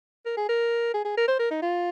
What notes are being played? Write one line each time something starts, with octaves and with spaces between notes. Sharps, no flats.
A#4
G#4
A#4
G#4
G#4
A#4
C5
A#4
D#4
F4